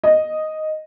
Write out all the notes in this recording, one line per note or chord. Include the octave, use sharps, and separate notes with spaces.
D#5